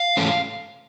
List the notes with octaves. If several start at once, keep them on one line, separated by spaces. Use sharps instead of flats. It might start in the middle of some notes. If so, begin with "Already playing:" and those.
Already playing: F5
G#2 E3 A3 C#4